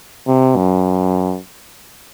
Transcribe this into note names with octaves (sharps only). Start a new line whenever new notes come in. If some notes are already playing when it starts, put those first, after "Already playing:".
C3
F#2